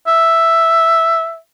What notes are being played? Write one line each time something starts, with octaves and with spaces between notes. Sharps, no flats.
E5